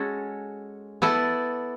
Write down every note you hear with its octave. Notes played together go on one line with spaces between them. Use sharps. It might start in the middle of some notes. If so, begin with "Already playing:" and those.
Already playing: G#3 C#4 F#4 A4
B3 E4 A4 D5